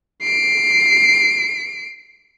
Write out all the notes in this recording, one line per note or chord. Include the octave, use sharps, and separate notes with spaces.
C7 D7